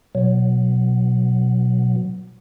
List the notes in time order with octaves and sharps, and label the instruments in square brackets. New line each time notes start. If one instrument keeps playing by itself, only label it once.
[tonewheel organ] B2 F#3